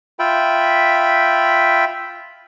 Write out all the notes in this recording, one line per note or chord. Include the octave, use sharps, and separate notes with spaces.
F4 E5 G5 B5